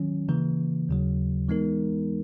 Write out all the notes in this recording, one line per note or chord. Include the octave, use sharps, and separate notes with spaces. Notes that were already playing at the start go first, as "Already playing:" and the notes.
Already playing: D#3 F#3 C#4
C#3 E3 A#3
D#2 C#3 F#3
E3 G#3 B3 D#4 A#4